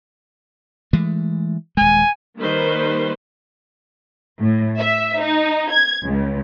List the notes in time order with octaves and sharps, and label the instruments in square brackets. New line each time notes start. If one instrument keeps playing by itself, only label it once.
[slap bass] E3 G#3 A3
[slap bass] D#1 G#3 [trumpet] G#5
[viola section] D#3 G3 A#3 B4 C5
[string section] A2
E5
D#4
G#6
C#2